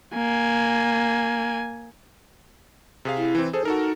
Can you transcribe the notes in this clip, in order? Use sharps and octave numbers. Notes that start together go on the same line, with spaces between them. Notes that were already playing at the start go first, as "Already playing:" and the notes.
A#3 G#5
C3 G#4 F5
E4
E3 C4
G#4 A4 C5
D#4 F#4 A4 A#4